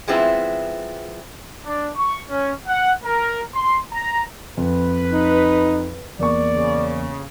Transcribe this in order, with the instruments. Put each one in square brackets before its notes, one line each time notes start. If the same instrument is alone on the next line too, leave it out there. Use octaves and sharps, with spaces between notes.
[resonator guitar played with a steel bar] F3 G#3 B3 C4 E4
[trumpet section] D4
C#6
C#4
F#5
A#4
C6
A#5
[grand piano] F2 [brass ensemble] B4
[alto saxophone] D#4
[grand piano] E2 A#3 C#6 [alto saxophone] D5
[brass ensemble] C#3